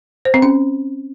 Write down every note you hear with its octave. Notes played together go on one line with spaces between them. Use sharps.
C5
C4
C#4